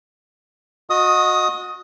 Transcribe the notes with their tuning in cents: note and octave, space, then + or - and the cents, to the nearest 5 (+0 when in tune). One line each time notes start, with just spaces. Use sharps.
F#4 -25 D#5 +0 D#6 +15